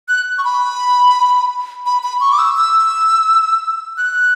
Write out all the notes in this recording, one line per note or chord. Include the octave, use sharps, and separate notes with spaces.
F#6
C#6
B5
B5
B5
C#6
D6
E6
E6
F#6